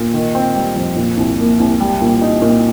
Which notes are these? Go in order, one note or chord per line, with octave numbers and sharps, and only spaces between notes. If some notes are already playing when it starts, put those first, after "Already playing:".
Already playing: A#2
D#3
C4
G3
F2
A#2
C2
A#3
C2
G3
A#2
D#4
A#2